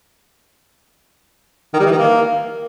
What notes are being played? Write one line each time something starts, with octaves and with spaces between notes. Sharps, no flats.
D#3
G3
E3
D#3
A#3